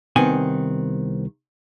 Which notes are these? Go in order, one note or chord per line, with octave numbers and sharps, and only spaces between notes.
C2 D#3 B3 C4 G#5